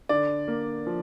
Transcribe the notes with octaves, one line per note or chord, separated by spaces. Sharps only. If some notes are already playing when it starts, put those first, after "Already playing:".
D3 D5
A#3
F3